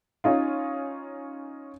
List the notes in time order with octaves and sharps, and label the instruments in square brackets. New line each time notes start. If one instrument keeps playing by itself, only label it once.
[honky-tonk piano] C#4 D#4 F4